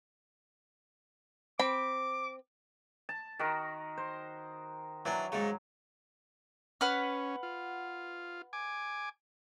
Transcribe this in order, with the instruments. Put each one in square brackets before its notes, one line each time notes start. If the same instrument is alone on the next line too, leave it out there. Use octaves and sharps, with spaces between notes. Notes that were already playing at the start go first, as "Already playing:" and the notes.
[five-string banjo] C4 B5 [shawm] D6
[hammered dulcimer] A5
D#3 F#4 A#4
C5
[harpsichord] E3 D4 [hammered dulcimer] F#3
[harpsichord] G#2 C#3
[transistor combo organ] C#4 [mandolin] B4 F#5 F6
[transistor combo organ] F4
G#5 D6